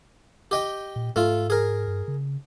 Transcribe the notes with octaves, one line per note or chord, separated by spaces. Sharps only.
G4 D#5 G5
A#2
G#2 A3 F4
G#4 A#4
G2
C#3